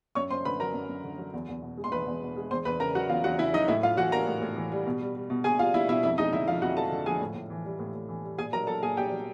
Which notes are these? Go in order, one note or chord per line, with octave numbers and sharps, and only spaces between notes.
F#2 C#5 C#6
F#2 C5 C6
D3 B4 B5
F#3 A#4 A#5
F#2
F#2
D3
F#3
E2
E2
B2
G#3
C6
E2 B4 B5
E2
B2
G#3
E2 C5 C6
E2 B4 B5
C#3 A#4 A#5
F#3 F#4 F#5
E2 F4 F5
E2 F#4 F#5
C#3 E4 E5
F#3 D#4 D#5
A2 E4 E5
A2 F4 F5
E3 F#4 F#5
G3 A#4 A#5
A2
A2
E3
G3
B2
G3
G3
B2
B2 G#4 G#5
G3 F4 F5
G3 E4 E5
B2 E4 E5
F2 E4 E5
G#3 D#4 D#5
D3 E4 E5
F3 F4 F5
F2 F#4 F#5
G#3 A4 A5
D3
F3 G#4 G#5
A2
A2
E3
G3
A2
A2
E3
G3
A#2 G#4 G#5
F#3 A#4 A#5
F#3 A4 A5
A#2 G#4 G#5
A#2 G4 G5
F#3